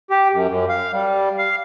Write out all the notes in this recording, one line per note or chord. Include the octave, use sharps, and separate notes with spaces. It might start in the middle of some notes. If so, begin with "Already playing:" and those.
G4
F#2
F#2
F5
G3
F5